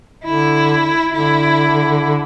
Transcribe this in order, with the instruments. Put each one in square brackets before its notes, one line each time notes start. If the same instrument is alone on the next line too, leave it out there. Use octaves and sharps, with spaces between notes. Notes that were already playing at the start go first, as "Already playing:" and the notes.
[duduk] D3 [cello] E4
[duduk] D3 [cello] E4